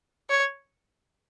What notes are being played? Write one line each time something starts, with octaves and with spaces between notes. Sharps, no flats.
C#5